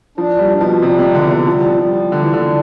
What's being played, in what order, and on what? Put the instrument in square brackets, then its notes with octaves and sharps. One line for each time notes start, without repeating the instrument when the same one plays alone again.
[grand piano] F3 [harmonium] D4
[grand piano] G3
[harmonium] B2
[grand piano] F3
[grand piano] C3 [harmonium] G3
[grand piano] C3
[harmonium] E2 [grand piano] D3
[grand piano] D3
[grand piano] F3 [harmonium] G3
[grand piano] F3 [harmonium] G3
[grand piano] D3 [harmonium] D4
[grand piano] E3
D3
[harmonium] G3